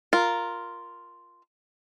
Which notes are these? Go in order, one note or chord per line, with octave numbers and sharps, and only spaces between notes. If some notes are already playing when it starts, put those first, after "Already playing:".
F4 A#4